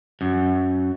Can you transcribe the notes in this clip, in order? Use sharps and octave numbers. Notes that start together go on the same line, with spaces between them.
F#2